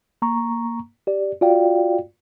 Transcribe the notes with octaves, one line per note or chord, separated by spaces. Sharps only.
A#3 A#5 C#6
G4 D5
F4 F#4 D5 F5 G5